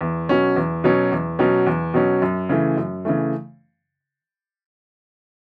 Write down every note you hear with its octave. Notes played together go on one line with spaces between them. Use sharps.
E2
B2 F#3 C#4
E2
B2 F#3 C#4
E2
B2 F#3 C#4
E2
B2 F#3 C#4
F#2
C#3 E3 A3
F#2
C#3 E3 A3